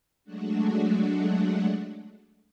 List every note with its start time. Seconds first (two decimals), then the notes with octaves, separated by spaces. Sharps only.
0.24 F#3 G#3 A3 D4 F#4